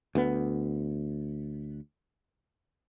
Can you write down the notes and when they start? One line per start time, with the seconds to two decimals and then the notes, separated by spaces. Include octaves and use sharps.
0.15 D2 B3